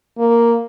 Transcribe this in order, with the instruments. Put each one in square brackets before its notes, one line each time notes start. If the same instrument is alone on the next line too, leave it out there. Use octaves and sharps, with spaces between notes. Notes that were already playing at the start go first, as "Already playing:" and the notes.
[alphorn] A#3